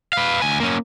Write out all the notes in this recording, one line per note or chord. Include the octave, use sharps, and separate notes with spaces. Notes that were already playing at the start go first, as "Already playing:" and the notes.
B4 F5
D2 G#5
A#3 C#4